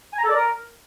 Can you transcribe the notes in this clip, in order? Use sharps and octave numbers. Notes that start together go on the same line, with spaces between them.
G#5
A#5
A4
D5
A#4